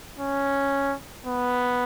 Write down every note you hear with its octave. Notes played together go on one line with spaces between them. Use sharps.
C#4
B3